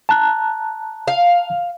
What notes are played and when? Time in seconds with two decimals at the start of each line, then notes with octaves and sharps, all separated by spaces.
0.09 A5 A#5 F#6
1.08 F5